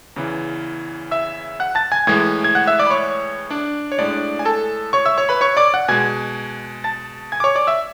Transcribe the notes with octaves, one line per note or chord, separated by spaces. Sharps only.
E2 C#3 E3
E5 E6
F#5 F#6
A5 A6
G#5 G#6
A2 E3 G#3 G#5 G#6
G#6
F#5 F#6
E5 E6
D5 D6
B5
C#5 C#6
D4 D5
C#5
A2 G#3 D4 D5
G#5
A4 A5
C#5 C#6
E5 E6
C#5 C#6
B4 B5
C#5 C#6
D5 D6
F#5 F#6
B2 G#3 G#5 G#6
A5 A6
G#5 G#6
D6
C#5 C#6
D5 D6
E5 E6